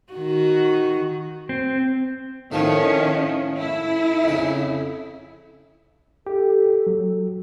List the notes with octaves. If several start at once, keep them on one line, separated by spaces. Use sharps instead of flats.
D#3 F#4
C4
A2 D#3 F3 C#4
E4
F2 C#3
G4 A4
F#3